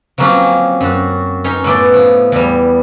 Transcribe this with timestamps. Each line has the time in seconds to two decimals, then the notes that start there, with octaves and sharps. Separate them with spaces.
0.18 F3 F#3 A#3 C4 C#4 F4
0.81 F#2 F#4
1.44 C#4 D#4 C#5 C6
1.64 A2 B3 D5 C6
1.94 F3
2.32 E2 G3